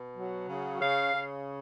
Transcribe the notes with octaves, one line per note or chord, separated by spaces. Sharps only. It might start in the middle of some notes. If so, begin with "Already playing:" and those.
Already playing: B2
F#3
C#3
C#3 F5
C#3